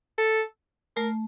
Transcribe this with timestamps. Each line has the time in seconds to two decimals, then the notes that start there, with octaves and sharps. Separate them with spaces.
0.18 A4
0.97 A3 A#4